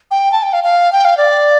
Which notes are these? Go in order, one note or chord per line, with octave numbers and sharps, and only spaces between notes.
G5
A5
G5
F5
F5
G5
F5
D5